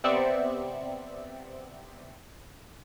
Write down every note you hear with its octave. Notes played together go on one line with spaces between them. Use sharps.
C3 B3 C4 D5 E5 C#7